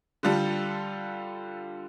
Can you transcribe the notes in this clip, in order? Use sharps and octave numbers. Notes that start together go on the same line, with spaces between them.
D3 G3 F4 A4